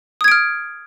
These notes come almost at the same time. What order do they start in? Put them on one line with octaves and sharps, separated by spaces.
D#6 G#6 D7 F6